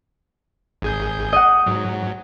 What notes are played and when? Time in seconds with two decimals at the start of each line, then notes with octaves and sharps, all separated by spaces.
0.82 G#1 G#4 G6
1.33 D#5 F#5
1.66 G#2 F#3